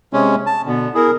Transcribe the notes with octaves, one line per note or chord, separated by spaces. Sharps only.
C3 G#3 C#4
A5
B2 D3 B3
E4 G#4 A#4